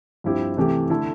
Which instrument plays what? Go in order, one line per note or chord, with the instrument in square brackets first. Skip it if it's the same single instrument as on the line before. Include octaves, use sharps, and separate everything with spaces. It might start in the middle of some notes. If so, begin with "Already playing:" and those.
[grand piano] G2 F3 C4 E4 G4
C3 E3 A3 E4 G4
D3 A3 E4 A4